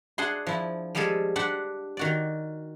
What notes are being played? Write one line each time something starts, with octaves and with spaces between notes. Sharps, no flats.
D4 G#4 F#5 C6
F3 E4
F3 G3 G#3 G#4 A4
D4 G4 F#5 C6
D#3 F#4 D5